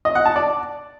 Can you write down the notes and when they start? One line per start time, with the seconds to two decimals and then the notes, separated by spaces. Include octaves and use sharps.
0.05 D#5
0.15 F#5
0.26 A5
0.36 D5